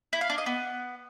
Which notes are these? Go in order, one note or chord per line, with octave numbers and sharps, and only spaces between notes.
E4
F5
D4
D#5
B3